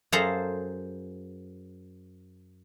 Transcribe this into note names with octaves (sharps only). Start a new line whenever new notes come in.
F#2 G#4 A4 C5 F5 A#5